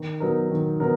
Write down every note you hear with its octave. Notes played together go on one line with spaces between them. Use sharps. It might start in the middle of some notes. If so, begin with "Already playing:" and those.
Already playing: D#3
F#3 B3 D#4 A#4
D#3
F#3 B3 D#4 A#4